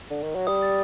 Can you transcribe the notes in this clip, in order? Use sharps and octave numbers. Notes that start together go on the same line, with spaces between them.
D3
D#3
F#3
G3 D#6
A6